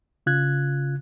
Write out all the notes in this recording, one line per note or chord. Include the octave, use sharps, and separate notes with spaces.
C#3 F4 F#6 G#6